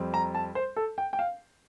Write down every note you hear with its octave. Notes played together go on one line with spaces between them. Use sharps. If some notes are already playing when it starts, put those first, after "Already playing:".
Already playing: F2 G3 C4
A#5
A5
C5
A4
G5
G5
F5